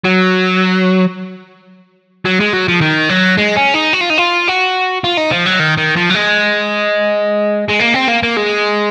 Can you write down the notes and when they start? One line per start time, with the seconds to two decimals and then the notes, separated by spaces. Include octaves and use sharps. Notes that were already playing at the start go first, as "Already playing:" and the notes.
0.04 F#3
2.26 F#3
2.40 G#3
2.53 F#3
2.68 F3
2.81 D#3
3.09 F#3
3.37 G#3
3.56 C#4
3.74 D#4
3.93 F#4
4.01 F4
4.10 D#4
4.18 F4
4.48 F#4
5.04 F4
5.17 D#4
5.31 F3
5.46 F#3
5.59 D#3
5.77 D#3
5.96 F3
6.10 F#3
6.14 G#3
7.69 G#3
7.80 A#3
7.95 C4
8.08 A#3
8.23 A#3
8.37 G#3